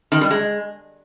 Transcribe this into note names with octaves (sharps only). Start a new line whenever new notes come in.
D#3
G3
G#3